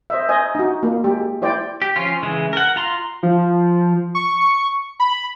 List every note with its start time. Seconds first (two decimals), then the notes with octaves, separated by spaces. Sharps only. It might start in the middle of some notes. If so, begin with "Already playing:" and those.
0.10 C5 D#5 E5
0.29 C5 D#5 G#5
0.55 D#4 F#4
0.83 A#3 F4
1.04 G#3 G4
1.42 E4 C5 D5 G5
1.82 G4
1.96 F3 C#4 F4
2.23 C#3 E3 G#3
2.53 A#4 F#5
2.76 F4 A#5 C6
3.23 F3
4.15 C#6
5.00 B5